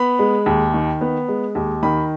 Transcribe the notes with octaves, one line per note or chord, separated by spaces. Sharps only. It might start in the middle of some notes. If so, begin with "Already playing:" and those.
Already playing: B3 B5
G#3
D#2
D#3
B3
G#3
D#2
D#3 B5